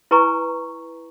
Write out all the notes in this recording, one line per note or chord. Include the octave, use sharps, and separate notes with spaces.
E4 B4 G#5 A#5 C#6